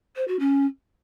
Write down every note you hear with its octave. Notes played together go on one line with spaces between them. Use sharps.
C5
F#4
C#4